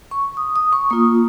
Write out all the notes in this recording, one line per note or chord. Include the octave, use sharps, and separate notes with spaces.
C#6
D#6
D#6
C#6
A#3 F4 D#6